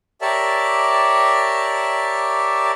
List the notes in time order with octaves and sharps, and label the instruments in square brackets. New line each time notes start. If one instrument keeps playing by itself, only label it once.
[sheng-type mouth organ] G4 A#4 C#5 D5 E5 A5